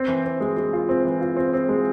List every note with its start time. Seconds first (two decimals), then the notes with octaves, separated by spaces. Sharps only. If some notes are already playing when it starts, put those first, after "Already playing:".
Already playing: C4
0.08 E3
0.25 C4
0.40 G#3
0.57 G#3
0.73 F4
0.89 C4
1.05 E3
1.21 F4
1.36 C4
1.53 C4
1.69 G#3